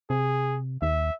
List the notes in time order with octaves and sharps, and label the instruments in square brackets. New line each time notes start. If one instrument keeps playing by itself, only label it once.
[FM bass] C3 [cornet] G#4
[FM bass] D#2 [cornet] E5